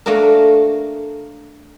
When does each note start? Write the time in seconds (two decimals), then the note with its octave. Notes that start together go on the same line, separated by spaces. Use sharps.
0.06 A3 A#3 D4 F#4 A#4